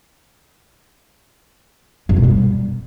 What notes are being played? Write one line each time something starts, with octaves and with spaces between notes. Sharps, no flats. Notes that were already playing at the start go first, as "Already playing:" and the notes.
F#2
B2
G3